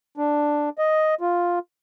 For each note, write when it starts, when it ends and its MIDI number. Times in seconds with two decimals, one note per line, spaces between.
0.17 0.69 62
0.78 1.15 75
1.21 1.59 65